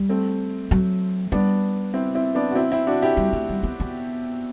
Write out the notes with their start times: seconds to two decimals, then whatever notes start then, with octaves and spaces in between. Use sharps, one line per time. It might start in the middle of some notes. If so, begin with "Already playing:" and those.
Already playing: G3
0.09 A3 C4
0.71 F#3
1.32 G3 B3 D4
1.94 C4 E4
2.15 C4 E4
2.35 B3 D4
2.51 F#4
2.55 C4 E4
2.72 C4 E4
2.87 D4 F#4
3.02 E4 G4
3.17 G3
3.33 A3
3.49 G3
3.63 B3
3.80 B3